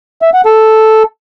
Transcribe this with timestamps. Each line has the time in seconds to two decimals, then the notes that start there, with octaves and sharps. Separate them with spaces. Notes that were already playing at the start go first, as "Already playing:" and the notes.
0.22 E5
0.34 F#5
0.45 A4